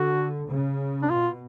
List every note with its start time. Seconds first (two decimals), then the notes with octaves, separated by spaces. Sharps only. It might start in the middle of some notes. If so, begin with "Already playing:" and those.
Already playing: D3 F#4
0.51 C#3
1.02 D4
1.10 B2 F4